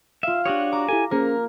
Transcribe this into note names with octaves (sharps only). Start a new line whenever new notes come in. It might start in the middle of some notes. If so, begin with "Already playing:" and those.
F4 E5 F5
D4 F#4 G4 C#5 D#6
A#5 D6
E4 G4 A4 G#5
A#3 C#4 G#4 A#4 C5